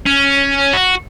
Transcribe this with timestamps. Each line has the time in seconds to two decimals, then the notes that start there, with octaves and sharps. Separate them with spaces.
0.06 C#4
0.73 F#4